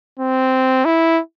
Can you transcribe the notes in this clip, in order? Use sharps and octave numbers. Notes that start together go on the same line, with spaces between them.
C4
E4